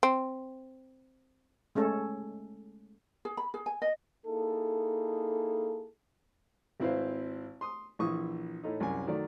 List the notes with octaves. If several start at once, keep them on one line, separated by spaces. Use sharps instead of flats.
C4
G#3 A3 C#4 A4
G#4
B5
G#4
G#5
D#5
A#3 D#4 E4 G#4 A4
G#1 C4 E4 B4 C5 F5
C6 D#6
A#1 E3 E4 C#6 D#6
A2 A3 D#4
C2 F#2 G#5
D#3 F#3 A3 D5